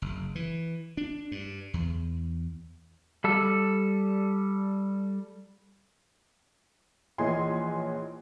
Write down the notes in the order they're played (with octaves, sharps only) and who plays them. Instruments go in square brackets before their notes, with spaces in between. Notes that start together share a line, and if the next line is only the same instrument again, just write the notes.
[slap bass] F#1
E3
D4
G2
E2
[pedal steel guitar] G3 A4
[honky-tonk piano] A#1 E3 C#5 D#5 G#5 C6